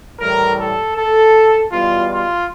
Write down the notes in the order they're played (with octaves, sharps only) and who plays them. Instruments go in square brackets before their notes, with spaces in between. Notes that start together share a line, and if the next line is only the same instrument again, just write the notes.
[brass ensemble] A2 E3 G3 A#4
A4
A4
E2 B2 G3 F4
F4